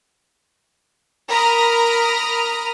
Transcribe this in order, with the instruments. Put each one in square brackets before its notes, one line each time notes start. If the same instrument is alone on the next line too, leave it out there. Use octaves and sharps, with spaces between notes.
[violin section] A#4 A#5 B5 D#6 F6